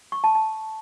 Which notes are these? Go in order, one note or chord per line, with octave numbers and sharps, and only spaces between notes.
C#6
A5
A5